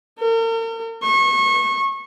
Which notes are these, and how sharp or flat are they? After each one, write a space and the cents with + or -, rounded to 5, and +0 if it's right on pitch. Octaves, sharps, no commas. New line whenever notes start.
A#4 -40
C#6 -30